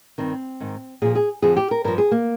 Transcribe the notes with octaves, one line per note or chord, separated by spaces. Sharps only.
G2 D#3 C4
G#2 D#3
A#2 F3 G#4
G#4
F2 D3 F3 G#4
G4
A#4
G2 F3 A#4
G#4
A#3